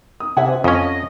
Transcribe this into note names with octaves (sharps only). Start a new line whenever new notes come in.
D#6
C3 E5 F#5 G#5
F2 C#4 D#5